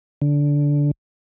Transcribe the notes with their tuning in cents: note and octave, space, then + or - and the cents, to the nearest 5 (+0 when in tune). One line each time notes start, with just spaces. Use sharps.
D3 -15